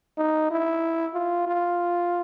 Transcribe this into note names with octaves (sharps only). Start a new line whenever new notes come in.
D#4
E4
F4
F4